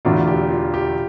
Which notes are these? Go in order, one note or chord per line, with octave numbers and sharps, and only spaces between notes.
E1 E2 D3 A3 D4 F4
G4
F4
G4